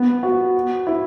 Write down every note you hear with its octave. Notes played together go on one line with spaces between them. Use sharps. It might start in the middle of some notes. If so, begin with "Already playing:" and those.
Already playing: B3
F#4
E4